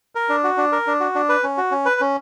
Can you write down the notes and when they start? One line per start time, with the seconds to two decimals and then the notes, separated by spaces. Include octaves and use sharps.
0.15 A#4
0.29 D4
0.44 F#4
0.57 D4
0.72 A#4
0.87 D4
1.00 F#4
1.15 D4
1.29 B4
1.43 C#4
1.57 F#4
1.71 C#4
1.85 B4
2.01 C#4